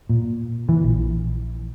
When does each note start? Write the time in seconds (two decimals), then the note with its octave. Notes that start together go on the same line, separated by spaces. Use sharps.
0.09 A#2
0.69 E3
0.84 A#1